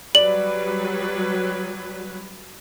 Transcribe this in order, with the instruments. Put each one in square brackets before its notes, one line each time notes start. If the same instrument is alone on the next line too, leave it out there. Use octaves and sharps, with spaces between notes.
[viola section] F#3 G3 B4 [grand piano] D5 [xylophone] F#7